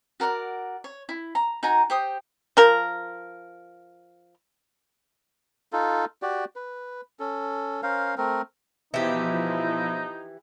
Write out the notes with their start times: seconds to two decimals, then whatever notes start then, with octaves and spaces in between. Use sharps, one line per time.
0.20 F#4 A#4 D5 F#5
0.84 C#5
1.09 E4
1.35 A#5
1.63 D#4 F#4 G#5 A#5
1.90 G4 C5 D#6
2.57 F3 A#4
5.73 D#4 F4 A4
6.22 F#4 G4 D5
6.56 B4
7.19 C#4 A4
7.83 C#4 A#4 C5 F5
8.18 A3 C4 A#4
8.94 B2 E3 F3 B3 D#4 E4 G4